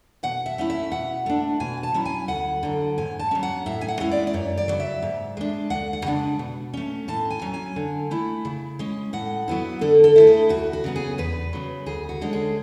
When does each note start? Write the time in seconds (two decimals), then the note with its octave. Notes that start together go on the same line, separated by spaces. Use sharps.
0.23 B2 F#5
0.46 E5
0.58 A3 C#4 E4
0.70 E5
0.92 B2 F#5
1.26 A3 D4
1.60 B2 G#5
1.83 A5
1.94 F#3 C#4 E4
2.05 G#5
2.28 D2 F#5
2.63 D3 F#3
2.98 G#2 G#5
3.19 A5
3.31 F#3 C#4
3.43 F#5
3.66 A2 E5
3.81 G#5
3.88 F#5
4.00 G#3 C#4 E4
4.11 D5
4.27 D5
4.34 F#2 C#5
4.57 D5
4.68 C#3 F#3
4.80 E5
5.02 G#2
5.37 G#3 D4
5.70 D2 F#5
5.93 F#5
6.05 C#3 G#3 D4
6.39 B2
6.73 A3 C#4
7.08 A2 A5
7.30 G#5
7.41 F#3 C#4
7.54 G#5
7.76 D3
8.11 A3 E4
8.45 C#3
8.79 G#3 C#4
9.13 A2 F#5
9.48 F#3 B3 E4
9.81 D3 A4
10.04 A4
10.16 A3 E4
10.27 G#4
10.49 D2 F#4
10.73 F#4
10.84 C#3 F#3 B3
10.96 G#4
11.18 E2 B4
11.53 C#3 F#3
11.86 D2 G#4
12.09 F#4
12.21 D3 G#3 C#4
12.33 G#4